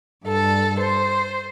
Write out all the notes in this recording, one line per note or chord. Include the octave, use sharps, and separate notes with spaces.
G2 A4
C5